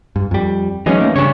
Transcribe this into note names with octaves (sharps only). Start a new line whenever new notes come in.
G2
F2 G3
E3 F#3 G#3 C#4 D#4
E3 A3 A#3
G2 C#3 D4 C#5